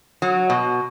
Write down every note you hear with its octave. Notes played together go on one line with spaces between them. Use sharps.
F#3
B2